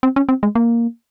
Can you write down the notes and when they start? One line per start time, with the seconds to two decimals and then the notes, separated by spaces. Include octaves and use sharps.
0.03 C4
0.16 C#4
0.29 C4
0.43 G#3
0.55 A#3